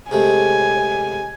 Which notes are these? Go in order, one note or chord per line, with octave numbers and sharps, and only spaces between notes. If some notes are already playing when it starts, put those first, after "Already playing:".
C3 G#3 A3 G#5